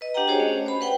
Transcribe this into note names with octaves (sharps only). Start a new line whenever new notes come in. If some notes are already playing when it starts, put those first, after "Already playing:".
B4 D#5
D4 G4 D#5 F#5 G5 A#5
F#4 G#4 C5 C#5 G#5
A3 C#4
C5 B5
B4 F#5 G5